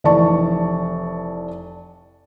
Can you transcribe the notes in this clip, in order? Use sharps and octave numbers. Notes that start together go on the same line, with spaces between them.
F1 E3 D5 A5 C#6